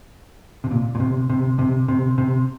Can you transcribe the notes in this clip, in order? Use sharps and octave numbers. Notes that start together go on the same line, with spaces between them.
C3
A#2
A#2
C3
C3
C3
C3
C3